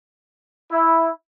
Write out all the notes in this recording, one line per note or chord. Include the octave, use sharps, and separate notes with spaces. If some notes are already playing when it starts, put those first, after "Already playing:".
E4